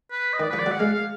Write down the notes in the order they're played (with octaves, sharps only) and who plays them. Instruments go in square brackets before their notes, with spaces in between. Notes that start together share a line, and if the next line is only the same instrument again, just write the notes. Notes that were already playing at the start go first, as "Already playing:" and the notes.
[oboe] B4
D#5
[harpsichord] D#3 [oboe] D5
[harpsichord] F3 [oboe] B4
[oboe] D5
[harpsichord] F#3
[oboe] F#5
[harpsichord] G#3 [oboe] F5
[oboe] F5